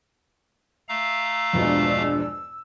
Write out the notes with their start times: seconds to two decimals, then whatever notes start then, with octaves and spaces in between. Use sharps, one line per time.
0.89 A3 F5 A#5 E6
1.53 E2 G2 B2 F3 G#3 D4